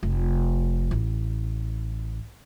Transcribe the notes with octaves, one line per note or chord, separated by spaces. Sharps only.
F1
A1